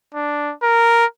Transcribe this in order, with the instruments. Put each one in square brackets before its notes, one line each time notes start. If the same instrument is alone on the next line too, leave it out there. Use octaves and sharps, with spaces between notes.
[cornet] D4
A#4